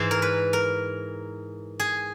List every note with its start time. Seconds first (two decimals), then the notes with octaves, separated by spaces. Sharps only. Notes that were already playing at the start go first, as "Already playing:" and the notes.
Already playing: G#2 E3 C5
0.11 A#4
0.22 B4
0.53 A#4
1.80 G#4